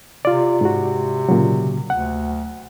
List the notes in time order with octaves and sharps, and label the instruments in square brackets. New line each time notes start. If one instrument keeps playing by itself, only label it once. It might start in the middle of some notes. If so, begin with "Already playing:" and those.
[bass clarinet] C3 [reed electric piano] F4 D5
[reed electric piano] G#2 F#4
A#2 C#3 F#3
[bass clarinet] D2 [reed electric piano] F#5